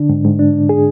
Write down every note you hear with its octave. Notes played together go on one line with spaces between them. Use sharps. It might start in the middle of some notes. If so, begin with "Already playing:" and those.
Already playing: D3 D4
G#2
G#2
D4
G#2
G#4